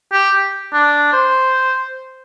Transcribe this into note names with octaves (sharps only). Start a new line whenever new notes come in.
G4
D4
C5